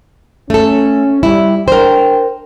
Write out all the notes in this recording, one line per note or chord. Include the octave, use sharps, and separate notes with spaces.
A3 C#4 A4
G3 E4
D4 A#4 C5 G5